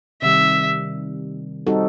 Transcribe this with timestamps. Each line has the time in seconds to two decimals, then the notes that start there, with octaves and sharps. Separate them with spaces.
0.22 C3 D#3 G3 E5
1.67 G3 C4 D#4 F#4 A4